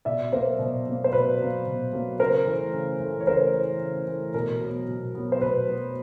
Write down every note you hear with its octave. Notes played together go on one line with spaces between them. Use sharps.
B2 D5 E5
F#3 A#3 A#4 C5
B2
F#3 A#3
C5
B2 B4
F#3 A#3
B2
F#3 A#3
C#3 A#4 C5
E3 A3
C#3
E3 A3
C#5
C#3 A#4 C5
E3 A3
C#3
E3 A3
B2 A#4
F#3 B3
B2
F#3 B3
C5
B2 B4
F#3 B3